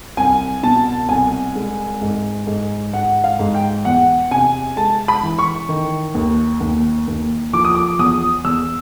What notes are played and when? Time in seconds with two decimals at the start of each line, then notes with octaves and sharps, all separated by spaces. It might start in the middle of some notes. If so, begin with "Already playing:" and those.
0.17 C2 G#5
0.63 B2 A5
1.09 C2 G#5
1.55 G#3
2.01 G#2
2.47 G#2
2.93 G#2 F#5
3.24 F5
3.39 G#2
3.54 G5
3.85 E2 F#5
4.31 C3 G#5
4.77 G#3 A5
5.08 B5
5.23 E3
5.39 C#6
5.69 D#3
6.15 D#2
6.60 D#2
7.07 D#2
7.53 F3 D6
7.65 D#6
7.75 D6
7.99 E2 D#6
8.44 E2 E6